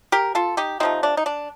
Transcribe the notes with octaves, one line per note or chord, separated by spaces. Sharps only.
G4 A#4
F4 A4
D#4 G4
C3 F3 A3 C4 D#4
D4
D#4
D4